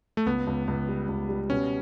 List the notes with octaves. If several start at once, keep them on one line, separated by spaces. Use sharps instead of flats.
A3
C#2 B3
C#2
C#2
G3
C#2
G3
B2 C#4